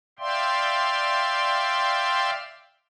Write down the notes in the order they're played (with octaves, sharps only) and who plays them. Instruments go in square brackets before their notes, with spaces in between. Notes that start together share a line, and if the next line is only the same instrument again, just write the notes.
[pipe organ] D5 E5 F5 G5 C6